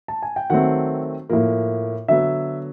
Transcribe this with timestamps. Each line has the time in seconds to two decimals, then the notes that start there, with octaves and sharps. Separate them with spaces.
0.08 A5
0.23 G#5
0.36 G5
0.50 D#3 F#3 A3 C4 F#5
1.30 A2 F3 A#3
2.08 D3 F#3 B3 E5